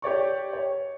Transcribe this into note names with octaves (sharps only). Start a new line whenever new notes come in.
G4 C#5 D5 C#6
C#5